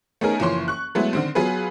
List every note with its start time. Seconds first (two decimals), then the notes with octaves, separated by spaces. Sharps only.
0.21 A3 B3 C#4 D#4 G#4 A#4
0.40 F#1 E3 F3 C#5 C6
0.68 C#6 F#6
0.95 F#3 G#3 A3 B3 E4
1.13 D3 D#3 C4
1.35 F#3 B3 F4 G#4 B4